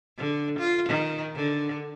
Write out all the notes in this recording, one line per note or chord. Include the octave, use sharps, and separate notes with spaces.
D3
F4
D#3
D3